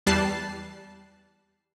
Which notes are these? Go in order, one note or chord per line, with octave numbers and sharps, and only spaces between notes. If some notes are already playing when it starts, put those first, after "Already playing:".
E2 G3 A5 F#6 C7